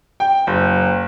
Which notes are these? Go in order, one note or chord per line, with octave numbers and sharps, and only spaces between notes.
G5
F#1